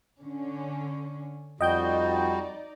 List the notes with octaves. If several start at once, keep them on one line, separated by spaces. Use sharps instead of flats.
D3 C#4
F2 G3 D#4 F#4 D5 D#5 G5 G6